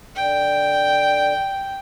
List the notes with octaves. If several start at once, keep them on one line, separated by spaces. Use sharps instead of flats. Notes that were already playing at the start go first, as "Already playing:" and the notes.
D3 G5